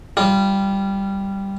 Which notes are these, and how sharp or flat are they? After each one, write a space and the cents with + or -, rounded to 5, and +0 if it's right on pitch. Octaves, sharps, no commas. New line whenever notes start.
G3 +0 F4 -25